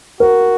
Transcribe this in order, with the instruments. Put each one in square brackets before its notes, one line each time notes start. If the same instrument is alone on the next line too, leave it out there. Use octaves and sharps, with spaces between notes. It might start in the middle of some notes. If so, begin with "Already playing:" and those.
[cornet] F#4 [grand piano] A#4